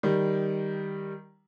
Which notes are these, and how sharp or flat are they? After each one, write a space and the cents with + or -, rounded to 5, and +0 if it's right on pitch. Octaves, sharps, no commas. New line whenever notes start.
D#3 +0 G3 +0